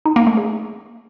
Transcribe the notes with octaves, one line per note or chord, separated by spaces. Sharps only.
D#4
A#3
A3
G#4